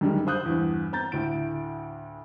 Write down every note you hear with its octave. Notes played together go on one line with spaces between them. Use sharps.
F#2 D3 D#3 G3 G#3
C5 F5 D#6 F#6 G6
E2 G2
C4 A#5 G6 A6
D2 A2 D7